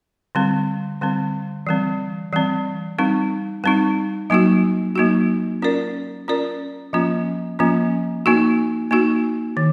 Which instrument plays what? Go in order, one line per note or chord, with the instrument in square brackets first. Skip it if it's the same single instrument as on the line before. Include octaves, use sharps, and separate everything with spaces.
[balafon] D3 G3 C4
D3 G3 C4
E3 G3 C4
E3 G3 C4
G3 C4 D#4
G3 C4 D#4
F#3 A#3 D#4 F#4
F#3 A#3 D#4 F#4
C#4 F4 A#4 D5
C#4 F4 A#4 D5
F3 A#3 C#4 F4
F3 A#3 C#4 F4
A#3 D#4 F#4
A#3 D#4 F#4
D#3